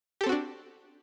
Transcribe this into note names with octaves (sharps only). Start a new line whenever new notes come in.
C4 D4 F#4 G4 A4